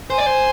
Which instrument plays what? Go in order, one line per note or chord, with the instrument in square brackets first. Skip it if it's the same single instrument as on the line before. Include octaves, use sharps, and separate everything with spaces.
[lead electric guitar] C5 [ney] G#5
[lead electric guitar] D5
C5